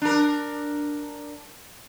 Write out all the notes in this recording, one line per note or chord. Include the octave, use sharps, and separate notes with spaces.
D4 A#4